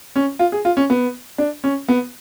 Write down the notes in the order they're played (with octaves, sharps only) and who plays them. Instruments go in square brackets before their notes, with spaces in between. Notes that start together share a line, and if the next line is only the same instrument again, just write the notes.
[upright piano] C#4
F4
G#4
F4
C#4
B3
D4
C#4
B3